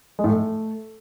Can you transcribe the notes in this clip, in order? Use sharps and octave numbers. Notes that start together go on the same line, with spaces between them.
G#3
A2
A3